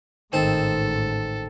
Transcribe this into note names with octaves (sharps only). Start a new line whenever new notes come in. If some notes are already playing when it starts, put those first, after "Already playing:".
A1 G#2 D#3 C4 A4